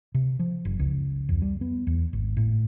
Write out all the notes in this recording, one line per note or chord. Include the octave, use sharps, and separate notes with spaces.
C3
F3
F#1
C#2
F2
G3
B3
E2
G#1
A2